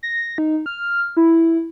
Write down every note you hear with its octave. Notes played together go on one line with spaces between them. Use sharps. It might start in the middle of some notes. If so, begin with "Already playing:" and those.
A#6
D#4
F6
E4